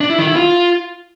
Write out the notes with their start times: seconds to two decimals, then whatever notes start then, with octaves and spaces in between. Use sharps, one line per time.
0.01 D4
0.10 E4
0.18 D#3
0.27 E4
0.36 F4